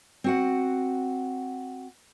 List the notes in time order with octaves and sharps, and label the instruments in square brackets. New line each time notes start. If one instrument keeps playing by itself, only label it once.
[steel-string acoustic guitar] C4 F#4 F#5